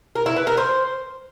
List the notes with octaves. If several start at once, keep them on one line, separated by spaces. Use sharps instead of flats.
A#4
E4
B4
A#4
C5